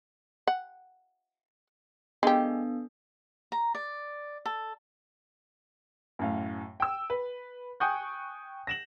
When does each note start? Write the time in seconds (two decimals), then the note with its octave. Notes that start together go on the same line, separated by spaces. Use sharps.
0.47 F#5
2.23 G#3 B3 D4 G4 A4
3.52 A#5
3.75 D5
4.46 A4
6.19 F#2 A2 F5
6.80 G5 E6
7.10 B4
7.80 G5 G#5 C#6 D#6 F#6 G6
8.67 A#6 E7 F#7